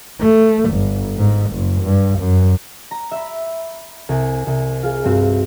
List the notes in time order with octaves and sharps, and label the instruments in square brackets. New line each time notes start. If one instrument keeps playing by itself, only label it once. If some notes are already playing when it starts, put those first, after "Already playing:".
[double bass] A3
G1
G#2
F#1
G2
F#2
[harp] A#5
E5 B5
C2 G#5
C2
F4 G#4
G2 C4 F#4